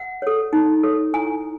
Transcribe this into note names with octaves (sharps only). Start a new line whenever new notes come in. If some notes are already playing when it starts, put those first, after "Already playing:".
Already playing: F#5
A4 C#5
D#4
A4 C#5
E4 G#5